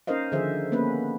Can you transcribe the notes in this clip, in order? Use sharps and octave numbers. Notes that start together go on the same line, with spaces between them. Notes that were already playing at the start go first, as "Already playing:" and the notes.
C#4 D#4 A#4 C5 D#5 F5
D3 D#3 F3 G#4 C5 E5
A#3 B3 C#4 B4